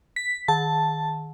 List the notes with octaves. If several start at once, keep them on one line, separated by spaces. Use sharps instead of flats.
B6
D#3 A5